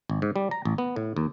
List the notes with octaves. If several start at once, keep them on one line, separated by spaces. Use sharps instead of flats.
G#1
G#2
G3
A#5
A1
B3
A2
D#2